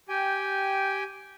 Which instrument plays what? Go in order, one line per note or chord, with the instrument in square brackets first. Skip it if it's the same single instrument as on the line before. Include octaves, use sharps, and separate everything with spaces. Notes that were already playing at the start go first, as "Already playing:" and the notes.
[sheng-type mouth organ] G4 G5 G#5